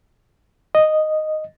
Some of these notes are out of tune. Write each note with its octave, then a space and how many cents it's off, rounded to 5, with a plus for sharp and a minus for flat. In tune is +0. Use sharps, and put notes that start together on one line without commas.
D#5 -5